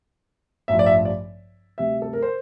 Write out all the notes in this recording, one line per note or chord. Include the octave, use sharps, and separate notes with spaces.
A1 G2 F3 E5
D5
E5
D5
D2 C3 G3 E5
A4
A#4
C5